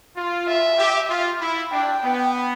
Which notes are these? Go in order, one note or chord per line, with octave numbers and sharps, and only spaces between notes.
F4
E5
G4
F4
E4
D4 G5
B3